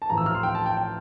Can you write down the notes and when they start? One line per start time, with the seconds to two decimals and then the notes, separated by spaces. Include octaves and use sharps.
0.02 A5
0.09 A1 A2 F3 A#5
0.18 E6
0.26 F6
0.35 C6
0.43 G5
0.55 A5
0.66 G5
0.77 G5